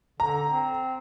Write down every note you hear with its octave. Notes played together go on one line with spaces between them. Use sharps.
D3 A#5
C4